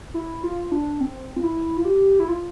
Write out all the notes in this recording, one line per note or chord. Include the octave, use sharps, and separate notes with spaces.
E4
F4
D4
C4
F4
E4
F4
G4
E4
F4